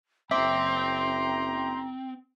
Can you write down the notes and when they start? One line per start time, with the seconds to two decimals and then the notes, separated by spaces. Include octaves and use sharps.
0.31 F#1 C4 E5 G5 A#5 C6 D6